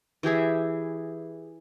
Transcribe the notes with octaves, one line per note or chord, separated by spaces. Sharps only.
E3 G4 G#4 E5